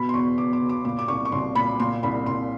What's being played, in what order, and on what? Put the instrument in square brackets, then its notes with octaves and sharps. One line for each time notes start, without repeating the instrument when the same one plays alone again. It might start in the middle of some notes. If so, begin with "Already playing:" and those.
Already playing: [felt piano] B2 B5
C6
E2 C#6
E2 D6
D6
B2
D6
A#2 D6
D6
C2 C#6
C#6
C2 C6
A#2 B5
A#2 C6
C2 B5
C2 C6